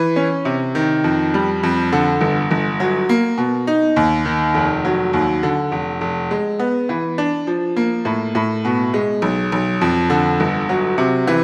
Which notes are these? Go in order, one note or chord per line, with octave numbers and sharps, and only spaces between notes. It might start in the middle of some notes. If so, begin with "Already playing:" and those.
Already playing: E3
C#4
C3
D#3
F2
G3
F2
D3
G1
G1
F#3
A#3
B2
D#4
D#2
D#3
F1
F#3
D#2
D3
F1
F1
G#3
B3
E3
D4
F3
A#3
A2
A2
B2
G#3
B1
B1
F2
D3
G1
F#3
C3
E3